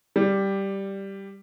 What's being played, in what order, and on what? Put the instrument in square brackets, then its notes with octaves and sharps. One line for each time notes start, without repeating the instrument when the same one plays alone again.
[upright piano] G3